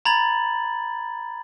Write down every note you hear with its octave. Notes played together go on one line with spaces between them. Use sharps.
A#5 B5 G#6 A6 F#7